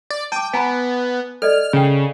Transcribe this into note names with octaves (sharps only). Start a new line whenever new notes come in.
D5
G5 A5 D6
B3 G#5 A#5 B5
A4 D5 D#5 F6
C#3 C#4 G5